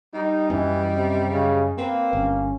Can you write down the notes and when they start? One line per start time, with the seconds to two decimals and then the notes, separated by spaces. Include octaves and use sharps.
0.14 G3 D#4
0.50 F#2 E3 C#4 D#5
0.95 C3
1.31 C#3
1.78 A#3 C4 B4
2.13 G1 C#4